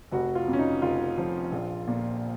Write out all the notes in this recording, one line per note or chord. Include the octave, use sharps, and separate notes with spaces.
F1 F#4
F4
F2
C#4
D#4
F1 F4
F3
A#1
A#2